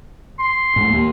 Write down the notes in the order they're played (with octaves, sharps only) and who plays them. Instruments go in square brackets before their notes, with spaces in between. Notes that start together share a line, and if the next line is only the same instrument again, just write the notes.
[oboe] C6
[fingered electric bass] A2 G#3
D#2 A#3